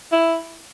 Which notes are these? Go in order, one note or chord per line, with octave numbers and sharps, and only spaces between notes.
E4